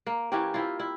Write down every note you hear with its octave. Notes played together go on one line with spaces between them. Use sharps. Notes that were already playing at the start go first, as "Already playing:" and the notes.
A#3
E3 A#3 C#4 G4
C4 E4 F4
E4